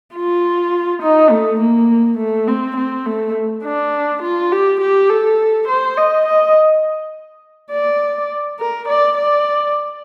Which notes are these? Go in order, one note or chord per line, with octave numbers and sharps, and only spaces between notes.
F4
D#4
A3
A#3
A3
C4
C4
A3
D4
F4
G4
G4
A4
C5
D#5
D#5
D5
A#4
D5
D5